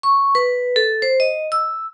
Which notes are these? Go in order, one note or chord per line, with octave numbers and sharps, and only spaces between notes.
C#6
B4
A4
C5
D#5
E6